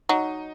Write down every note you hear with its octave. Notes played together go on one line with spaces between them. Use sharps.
F#3 D#4